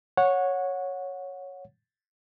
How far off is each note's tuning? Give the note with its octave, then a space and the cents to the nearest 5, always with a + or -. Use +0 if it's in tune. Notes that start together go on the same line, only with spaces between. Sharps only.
C#5 +0 F#5 -20